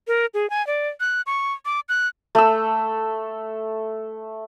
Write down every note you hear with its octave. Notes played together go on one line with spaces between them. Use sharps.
A#4
G#4
G#5
D5
F#6
C#6
D6
F#6
A3 E6